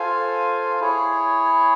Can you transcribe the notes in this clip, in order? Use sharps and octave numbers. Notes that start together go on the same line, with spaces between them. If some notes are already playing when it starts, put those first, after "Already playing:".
Already playing: F4 A4 C5 F5 G#5
E4 G#4 C#5